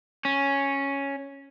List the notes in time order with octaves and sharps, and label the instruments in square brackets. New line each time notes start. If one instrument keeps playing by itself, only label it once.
[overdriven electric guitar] C#4